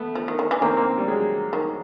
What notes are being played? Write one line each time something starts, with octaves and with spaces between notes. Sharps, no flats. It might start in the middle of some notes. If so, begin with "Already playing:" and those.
Already playing: A3 B3
F3
D#3
D#3
E3
D#3 A#3 C4
A#3 C4
G3
F#3 G#3
D#3